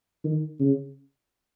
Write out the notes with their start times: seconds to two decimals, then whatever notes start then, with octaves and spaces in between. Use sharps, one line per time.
0.24 D#3
0.60 C#3